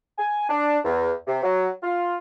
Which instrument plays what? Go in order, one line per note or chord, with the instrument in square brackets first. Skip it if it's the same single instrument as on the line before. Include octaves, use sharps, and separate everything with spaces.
[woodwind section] G#5
D4
E2
C3
F#3
F4